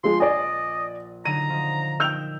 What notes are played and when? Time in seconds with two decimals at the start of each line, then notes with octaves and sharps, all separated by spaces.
0.04 F3 G#3 C6
0.20 A#1 D5 D#5 G#5
1.25 D3 F#3 D#4 A#5 D#7
1.50 F3 D#4
2.00 D#4 A#4 G5 E6 G6 F7